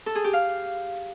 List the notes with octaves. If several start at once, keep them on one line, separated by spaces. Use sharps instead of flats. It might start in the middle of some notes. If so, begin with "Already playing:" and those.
A4
G#4
G4
F5